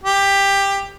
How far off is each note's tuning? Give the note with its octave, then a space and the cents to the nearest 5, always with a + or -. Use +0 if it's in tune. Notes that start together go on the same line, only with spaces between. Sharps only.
G4 +15